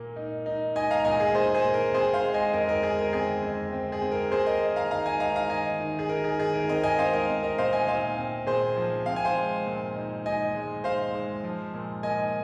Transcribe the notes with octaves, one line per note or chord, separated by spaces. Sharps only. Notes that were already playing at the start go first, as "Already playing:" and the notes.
Already playing: A#2 A#3
D#4
D#4
D#4 D#5 G#5
F5 A#5
A#2 D#5 G#5
G#4
A#2 G#4 C5
G#4 C5
A#3
A#4
C4 G#4 C5
C5 F5
G#3
D#5 G#5
F2 A#4 D#5
A#4
G#3 G#4
A#4
C4 G#4
F2
C4
G#4
C4
A#4
A#3 G#4 C5
A#4 D#5
A#3
F5 A#5
D#4 F5 A#5
D#5 G#5
D#4 F5 A#5
F5 A#5
D#3 D#5 G#5
D#3
G#4
D#3 A#4
G#4
D#3 G#4
A#4
C4 A#4 D#5
D#5 G#5
C4 C5 F5
A#4 D#5
C4
A#4 D#5
A#2 C5 F5
D#5 G#5
A#2 C5 F5
C4
A#2 G#4 C5
F3
C4 F5
G#5
C5 F5
G#3
A#2
D#4
D#4 D#5 G#5
G#3
D#4 C5 F5
G#3
F3
A#2
A#3 D#5 G#5